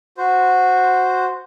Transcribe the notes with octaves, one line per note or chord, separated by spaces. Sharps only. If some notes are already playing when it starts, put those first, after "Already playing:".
F#4 C5